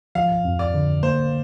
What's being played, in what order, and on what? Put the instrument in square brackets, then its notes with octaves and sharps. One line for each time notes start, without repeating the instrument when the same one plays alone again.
[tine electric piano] F3 [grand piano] F5
[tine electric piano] F2
[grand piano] D5
[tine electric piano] D3
[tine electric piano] A#3 [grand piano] C5